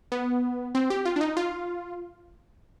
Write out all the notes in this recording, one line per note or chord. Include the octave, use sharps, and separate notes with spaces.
B3
C4
G4
F4
D4
D#4
F4